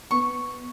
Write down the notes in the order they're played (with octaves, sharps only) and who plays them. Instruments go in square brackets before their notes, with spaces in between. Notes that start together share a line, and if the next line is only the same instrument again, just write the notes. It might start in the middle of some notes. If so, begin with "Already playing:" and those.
[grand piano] B3 [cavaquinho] C#6